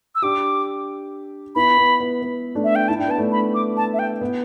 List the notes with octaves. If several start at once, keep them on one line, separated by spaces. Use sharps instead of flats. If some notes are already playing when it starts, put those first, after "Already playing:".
E6
D4 G4 D6
B3 E4 B5
B3
B3
B3
A3 D4
E5
G5
E4 A5
D4 G5
B3 A5
A3 D4
B5
D6
A5
E5
G5
B3